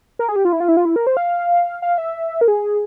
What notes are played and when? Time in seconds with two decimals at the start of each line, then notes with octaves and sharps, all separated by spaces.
0.19 A#4
0.29 G#4
0.36 G4
0.45 F4
0.53 E4
0.60 F4
0.68 E4
0.77 F4
0.85 E4
0.96 A#4
1.07 C5
1.17 F5
1.82 F5
1.98 E5
2.41 A#4
2.48 G#4